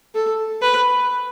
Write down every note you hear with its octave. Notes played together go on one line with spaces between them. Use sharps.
A4
B4